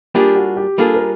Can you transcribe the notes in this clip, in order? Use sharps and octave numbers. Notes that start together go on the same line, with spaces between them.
G3 A#3 D4 F4 G4 G#4
F#4
G4
G3 A#3 D4 F4 G#4 A4
A#4